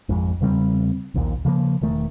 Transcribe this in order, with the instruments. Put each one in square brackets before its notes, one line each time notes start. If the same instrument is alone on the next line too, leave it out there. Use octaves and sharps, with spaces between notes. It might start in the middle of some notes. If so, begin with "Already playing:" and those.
[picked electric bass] G#1 F2 G#2
E2 C#3 G3 C4
A#1 D#2 A#2
C#3 F3 G#3 A#3
E1 D#3 A3